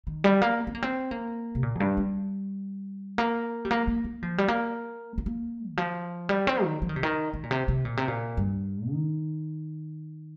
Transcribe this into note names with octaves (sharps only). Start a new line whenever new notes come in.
D#3
G3
A#3
C4
A#3
C4
A#3
C3
A#2
F2
G2
G3
A#3
G3
A#3
A#3
A#3
F3
G3
A#3
C4
A#3
D#3
F3
G3
C4
D#3
F3
D#3
C3
D#3
D#3
A#2
C3
C3
A#2
C3
A#2
G2
D#3